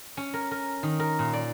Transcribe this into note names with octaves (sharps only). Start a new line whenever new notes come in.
C#4
A#4
A#4
D#3
A#4
A#2
D5